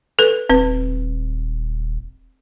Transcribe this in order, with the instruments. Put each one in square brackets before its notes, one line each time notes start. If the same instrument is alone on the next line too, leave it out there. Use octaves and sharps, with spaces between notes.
[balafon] A4 B4
[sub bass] D#1 [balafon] C4 B4